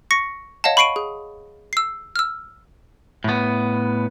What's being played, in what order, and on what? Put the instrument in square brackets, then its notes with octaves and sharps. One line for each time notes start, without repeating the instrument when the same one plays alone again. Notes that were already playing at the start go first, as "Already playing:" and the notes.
[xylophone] C#6 A#6 C#7
C#5 D#5 F5 F#5 A5
B5 C#6 C7 D7 D#7
G#4
E6 C7
E6 F6
[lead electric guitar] A2 B3